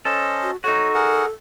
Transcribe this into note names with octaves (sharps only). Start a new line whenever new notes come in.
C#4 A4 C5 D#5
F#4
D#4 F#4 A4 C#5
G#4 A#4 F#5